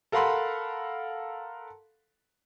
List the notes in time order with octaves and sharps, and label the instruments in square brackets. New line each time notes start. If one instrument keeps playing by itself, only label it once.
[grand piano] A4 A#4 F5 F#5 B5 C6